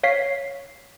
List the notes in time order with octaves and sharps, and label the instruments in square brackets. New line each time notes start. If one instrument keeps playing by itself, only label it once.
[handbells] C#5 F5 B6 C7